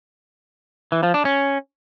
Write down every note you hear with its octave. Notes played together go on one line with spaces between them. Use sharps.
E3
F3
D4
C#4